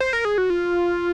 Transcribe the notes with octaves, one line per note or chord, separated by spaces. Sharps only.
C5
A#4
G#4
F#4
F4